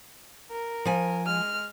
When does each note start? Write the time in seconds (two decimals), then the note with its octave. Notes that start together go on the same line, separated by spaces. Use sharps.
0.51 A#4
0.85 F3 G#5
1.26 G#3 F6